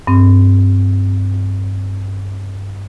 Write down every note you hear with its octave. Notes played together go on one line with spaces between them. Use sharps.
G2 C4